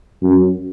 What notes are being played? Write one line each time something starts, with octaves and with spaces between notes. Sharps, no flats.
F#2